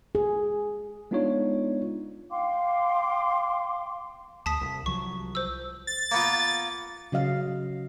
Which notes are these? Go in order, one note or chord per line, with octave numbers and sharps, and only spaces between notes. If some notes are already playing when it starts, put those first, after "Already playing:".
G#4
G#3 B3 D4 D#4 F4 C#5
F5 G5 C6 D6
D2 A5 D#6 B6
C2
C2 F3 F#3 C#6
C5 E6
A6
A#3 B3 F4
C#3 F#3 D#5 F5